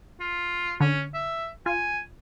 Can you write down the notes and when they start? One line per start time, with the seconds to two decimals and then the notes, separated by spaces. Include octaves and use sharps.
0.20 F4
0.80 D3 C#4
1.14 E5
1.66 F4 G#5